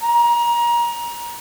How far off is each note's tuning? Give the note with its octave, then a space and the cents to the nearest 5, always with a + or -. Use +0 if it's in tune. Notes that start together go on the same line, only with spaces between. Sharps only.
A#5 +25